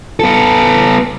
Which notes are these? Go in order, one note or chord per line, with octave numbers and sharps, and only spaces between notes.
B3 A4